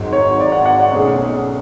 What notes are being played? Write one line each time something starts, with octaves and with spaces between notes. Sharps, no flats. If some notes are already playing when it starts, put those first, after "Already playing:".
Already playing: G#1 G#2 F#3
C#5
D5
F#5
F#5
D5
B1 B2 A3 C#4 G#4